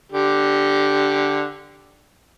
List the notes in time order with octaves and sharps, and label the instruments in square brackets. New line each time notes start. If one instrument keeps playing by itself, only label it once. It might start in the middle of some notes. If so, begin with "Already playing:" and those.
[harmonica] D3 G4